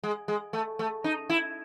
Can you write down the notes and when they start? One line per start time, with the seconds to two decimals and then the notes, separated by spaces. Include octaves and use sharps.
0.03 G#3
0.28 G#3
0.53 A3
0.79 A3
1.04 D#4
1.30 E4